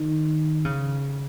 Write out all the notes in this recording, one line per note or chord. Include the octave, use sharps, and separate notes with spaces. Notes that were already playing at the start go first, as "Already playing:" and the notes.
Already playing: D#3
C#3